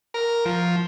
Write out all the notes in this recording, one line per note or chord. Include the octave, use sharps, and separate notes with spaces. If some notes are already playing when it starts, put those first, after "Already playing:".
A#4
F3